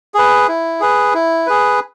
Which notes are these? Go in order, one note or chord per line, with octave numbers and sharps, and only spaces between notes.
G#4 B4
E4
G#4 B4
E4
G#4 B4